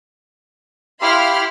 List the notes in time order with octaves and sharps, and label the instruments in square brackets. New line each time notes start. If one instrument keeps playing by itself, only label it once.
[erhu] E4 [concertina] G4 [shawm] F5 [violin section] B5 C6 F6